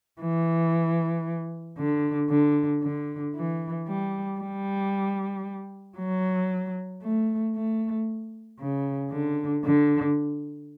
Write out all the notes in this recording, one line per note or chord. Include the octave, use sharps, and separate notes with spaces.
E3
D3
D3
D3
E3
G3
G3
F#3
A3
A3
C#3
D3
D3